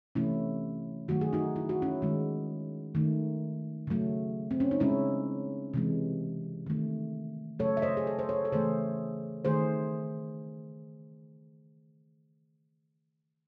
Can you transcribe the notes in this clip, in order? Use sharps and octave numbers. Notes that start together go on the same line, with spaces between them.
C3 E3 A3 C#4 E4
D#3 F#3 A3 F#4
G#4
D#4 F#4
E4
F#4
C#4 E4
D#3 G#3
D#3 A3
C#3 F#3 A3
C4
C#4
D#4
C#3 G#3 C#4 E4
C3 E3 G#3
D#3 A3
C#3 F#3 A3 A4 C#5
E5
C5 D#5
G#4
A4
C5
A4 C#5
A4
C#3 E3 A3 G#4 C5
D#3 A3 G#4 C5